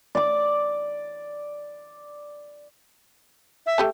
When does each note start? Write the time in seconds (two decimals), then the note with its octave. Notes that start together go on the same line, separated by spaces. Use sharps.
0.15 D5 D6
3.66 E5
3.78 A3 G4 A5